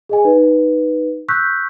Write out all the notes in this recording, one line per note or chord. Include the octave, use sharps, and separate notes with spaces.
G#4 D#5 G#5
D#4 B4
C#6 E6 F#6 G6 B6